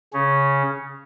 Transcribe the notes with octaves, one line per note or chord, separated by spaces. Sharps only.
C#3 C#4